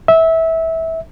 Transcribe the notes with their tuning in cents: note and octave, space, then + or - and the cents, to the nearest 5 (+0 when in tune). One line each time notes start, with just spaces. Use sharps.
E5 -20